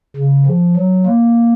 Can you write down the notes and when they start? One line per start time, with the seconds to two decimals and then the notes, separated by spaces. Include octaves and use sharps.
0.17 C#3
0.46 F3
0.76 F#3
1.06 A#3